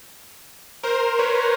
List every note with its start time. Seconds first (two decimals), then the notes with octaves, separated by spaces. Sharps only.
0.83 A#4 C5
1.19 B4 C#5